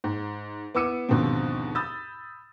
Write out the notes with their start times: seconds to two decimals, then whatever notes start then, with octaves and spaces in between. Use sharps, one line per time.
0.04 G#2
0.75 B3 E4 D6 E6 C#7 D#7
1.09 D#2 G#2 B2 D3 F3 C4
1.75 B5 D#6 E6 G6 A6